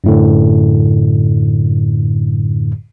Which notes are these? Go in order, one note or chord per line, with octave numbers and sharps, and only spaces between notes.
F#2 A2 D3